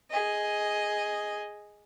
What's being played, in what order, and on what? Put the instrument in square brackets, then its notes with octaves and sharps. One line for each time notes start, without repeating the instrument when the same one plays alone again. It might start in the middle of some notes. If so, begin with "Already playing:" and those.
[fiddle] G#4 D#5